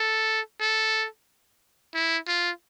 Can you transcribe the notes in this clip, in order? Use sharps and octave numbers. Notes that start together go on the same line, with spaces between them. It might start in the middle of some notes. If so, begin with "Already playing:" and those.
Already playing: A4
A4
E4
F4